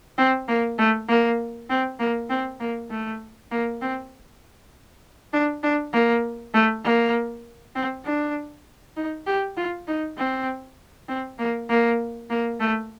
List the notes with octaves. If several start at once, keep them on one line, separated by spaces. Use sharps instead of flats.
C4
A#3
A3
A#3
C4
A#3
C4
A#3
A3
A#3
C4
D4
D4
A#3
A3
A#3
C4
D4
D#4
G4
F4
D#4
C4
C4
A#3
A#3
A#3
A3